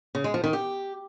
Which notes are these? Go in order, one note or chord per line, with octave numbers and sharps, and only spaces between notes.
C#3
G#3
F3
D#3
G4